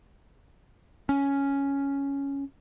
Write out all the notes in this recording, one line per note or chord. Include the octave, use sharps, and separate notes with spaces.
C#4